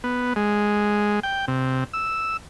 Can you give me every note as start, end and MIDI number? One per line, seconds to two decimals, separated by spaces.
0.04 0.33 59
0.36 1.20 56
1.23 1.45 79
1.48 1.84 48
1.94 2.37 88